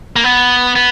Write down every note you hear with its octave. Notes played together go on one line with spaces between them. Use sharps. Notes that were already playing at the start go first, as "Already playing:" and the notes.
A#3
B3
B3